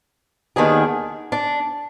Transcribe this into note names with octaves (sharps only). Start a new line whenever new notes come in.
D#2 D#3 B3 D4 G#4
D4